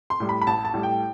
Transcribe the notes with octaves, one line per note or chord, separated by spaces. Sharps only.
C6
A2 G3
B5
B5
A1 A5
A5
A2 G3
G5